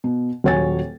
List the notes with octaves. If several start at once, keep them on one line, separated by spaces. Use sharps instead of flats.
B2
D#1 F#3 C#5 G#5 A6